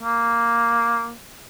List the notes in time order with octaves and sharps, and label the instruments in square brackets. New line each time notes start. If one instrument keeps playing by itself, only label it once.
[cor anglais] A#3